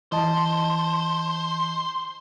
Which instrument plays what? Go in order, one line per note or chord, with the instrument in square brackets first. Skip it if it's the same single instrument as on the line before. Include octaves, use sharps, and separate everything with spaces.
[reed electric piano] E3 D#5 A5 [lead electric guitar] C5